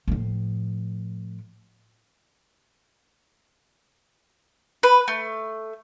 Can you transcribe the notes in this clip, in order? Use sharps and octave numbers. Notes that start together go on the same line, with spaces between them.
A2 F3
B4
A3